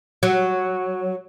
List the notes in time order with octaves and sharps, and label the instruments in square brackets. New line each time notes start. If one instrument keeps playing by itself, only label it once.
[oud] F#3